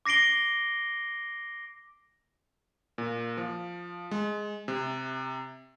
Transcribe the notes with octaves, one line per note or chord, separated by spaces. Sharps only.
D6 A#6 C7 D7 G7
A#2
F3
G#3
C3